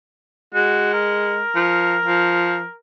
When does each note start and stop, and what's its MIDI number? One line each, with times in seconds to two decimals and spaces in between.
0.54 1.42 56
0.54 0.90 66
0.94 2.75 70
1.55 1.98 53
2.05 2.65 53